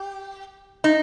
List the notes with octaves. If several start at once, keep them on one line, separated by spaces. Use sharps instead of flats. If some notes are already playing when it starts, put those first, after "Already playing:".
Already playing: G4
D#4